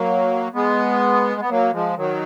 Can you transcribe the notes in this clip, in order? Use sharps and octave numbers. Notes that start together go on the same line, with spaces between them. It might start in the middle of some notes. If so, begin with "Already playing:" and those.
Already playing: F#3 A#3
G#3 B3
B3
F#3 A#3
F3 G#3
D#3 F#3